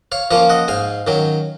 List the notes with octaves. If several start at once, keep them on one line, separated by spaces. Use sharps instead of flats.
C#5 F5
F3 A#3 C#4 C#5 F5
D#5 F#5
G#2 F5 G#5
D#3 F#3 C#4